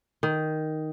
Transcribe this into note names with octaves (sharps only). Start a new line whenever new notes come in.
D#3